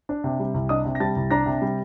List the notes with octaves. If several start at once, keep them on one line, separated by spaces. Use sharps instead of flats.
D4
C3
G3
C2
D4 D#5 D#6
C3
A#6
G3 A5 A6
C2
D4 A#5 A#6
C3
G3